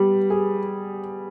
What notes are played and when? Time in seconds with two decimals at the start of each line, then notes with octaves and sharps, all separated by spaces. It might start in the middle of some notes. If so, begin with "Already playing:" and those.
Already playing: G3 B3
0.30 G#4